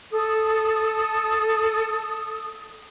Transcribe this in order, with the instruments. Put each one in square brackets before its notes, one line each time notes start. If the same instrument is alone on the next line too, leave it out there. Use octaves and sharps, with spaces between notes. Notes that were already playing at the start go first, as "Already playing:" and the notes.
[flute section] A4 D#6